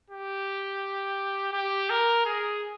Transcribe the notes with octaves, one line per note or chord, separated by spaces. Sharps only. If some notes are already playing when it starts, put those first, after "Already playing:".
G4
G4
A#4
G#4